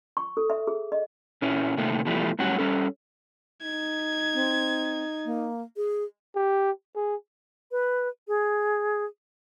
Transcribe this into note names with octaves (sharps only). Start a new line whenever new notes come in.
C#6
A4
E5
G#4
D#5
A#2 C#4 E4
A2 C3 D#3 A3 A#3
B2 E3 F3 G3 A3
A2 F#3 G3 C#4 F#4
G3 C#4 A4
D#4 G#6
C4
A#3
G#4
G4
G#4
B4
G#4